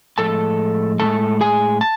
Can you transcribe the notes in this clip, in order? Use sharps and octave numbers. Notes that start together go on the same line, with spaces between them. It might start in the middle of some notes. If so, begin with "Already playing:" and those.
A2 F3 G#3 A4 A5
A2 F3 G#3 A4 A5
G#4 G#5
A5